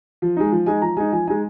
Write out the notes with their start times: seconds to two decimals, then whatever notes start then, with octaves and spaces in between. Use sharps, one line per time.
0.22 F3
0.37 G#3 D#4
0.52 F3
0.66 G#3 D#4 G#5
0.82 F3 A#5
0.97 G#3 D#4 G#5
1.12 F3 G#5
1.27 G#3 D#4 G#5